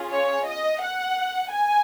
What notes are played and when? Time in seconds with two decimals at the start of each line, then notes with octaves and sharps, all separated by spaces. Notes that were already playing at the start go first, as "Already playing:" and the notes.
Already playing: C#4 F4 G#4
0.12 C#5
0.47 D#5
0.82 F#5
1.51 G#5